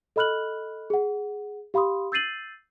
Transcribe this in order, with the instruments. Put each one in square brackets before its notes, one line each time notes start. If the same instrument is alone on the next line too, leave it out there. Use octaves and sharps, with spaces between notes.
[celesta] A4 D#5 B5 F6 F#6 F#7
G#4 F#5
G4 F5 B5 C6 D#6
E6 G6 A6 C7 D#7 F#7